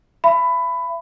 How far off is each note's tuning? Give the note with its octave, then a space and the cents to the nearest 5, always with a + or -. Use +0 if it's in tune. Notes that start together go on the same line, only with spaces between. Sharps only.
E5 +35 B5 +15